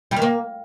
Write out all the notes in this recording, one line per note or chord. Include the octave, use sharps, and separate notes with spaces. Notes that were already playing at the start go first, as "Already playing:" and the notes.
G3
D#3
A#3